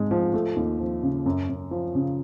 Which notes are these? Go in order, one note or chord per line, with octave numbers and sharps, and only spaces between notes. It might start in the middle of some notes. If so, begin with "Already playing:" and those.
Already playing: G#2 G#3
F3
A3
D#2
F3
C#3
F#2
F#2
F3
C#3